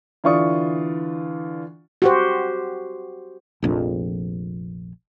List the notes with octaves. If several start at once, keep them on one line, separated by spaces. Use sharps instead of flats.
D3 E3 F4 D5 C#6 D#6
F#4 G4 C5
F1 A#1 F2